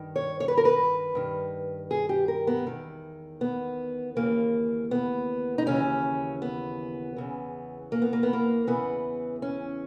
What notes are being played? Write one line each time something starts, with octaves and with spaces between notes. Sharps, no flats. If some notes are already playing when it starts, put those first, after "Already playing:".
Already playing: G2 D#3
C#5
C#5
B4
A#4
B4
G2 D#3
G#4
G4
A#4
B3
E2 D#3
B3
D#2 C#3 E3 A#3
B3
D#4
D#2 C#3 E3 C#4
B3
E2 C#3 E3
A#3
B3
A#3
B3
A#3
E2 C#3 E3 B3
C#4